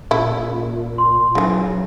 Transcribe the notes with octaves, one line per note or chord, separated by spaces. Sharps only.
A#2 C#3 E4
C6
C#3 E3 F#3 D#4 E5 G#5